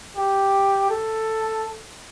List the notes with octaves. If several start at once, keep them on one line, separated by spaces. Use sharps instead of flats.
G4
A4